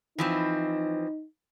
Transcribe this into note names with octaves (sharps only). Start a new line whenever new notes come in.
E3 F3 C4 D#4